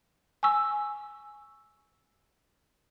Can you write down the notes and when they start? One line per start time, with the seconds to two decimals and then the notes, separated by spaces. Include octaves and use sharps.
0.43 G#5 C#6 E6